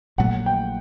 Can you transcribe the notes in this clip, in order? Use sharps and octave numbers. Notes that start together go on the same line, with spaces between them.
A#1 A#2 F#3 A3 F#5
G5